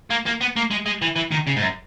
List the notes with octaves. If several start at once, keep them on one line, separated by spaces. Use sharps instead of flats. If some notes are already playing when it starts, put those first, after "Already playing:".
A#3
A#3
B3
A#3
G#3
G#3
E3
E3
D#3
C#3
G#2
F#2